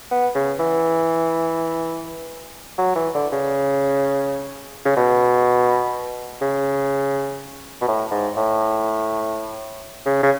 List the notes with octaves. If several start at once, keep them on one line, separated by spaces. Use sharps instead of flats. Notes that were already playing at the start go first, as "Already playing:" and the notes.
B3
C#3
E3
F#3
E3
D3
C#3
C#3
B2
C#3
B2
A2
G#2
A2
C#3
C#3